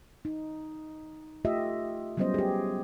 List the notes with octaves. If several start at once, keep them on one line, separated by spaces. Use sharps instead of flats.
D#4
A3 F4 G4 D#5 E5
F#3 G3 B3 C#4 C5 D#5
G4 G#4